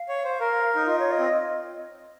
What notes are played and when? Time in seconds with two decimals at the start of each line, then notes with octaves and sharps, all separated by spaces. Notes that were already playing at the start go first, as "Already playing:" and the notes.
Already playing: F5
0.09 C#5
0.24 C5
0.40 A#4
0.76 D#4
0.86 F4 D#5
1.00 C#5
1.12 D#5
1.19 C4